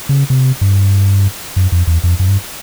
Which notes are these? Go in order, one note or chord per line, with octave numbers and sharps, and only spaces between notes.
C#3
C3
G2
F#2
F2
E2
F2
F#2
G2